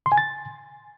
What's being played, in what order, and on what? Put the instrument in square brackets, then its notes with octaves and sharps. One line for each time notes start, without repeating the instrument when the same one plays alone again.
[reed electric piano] C6
G#5
A6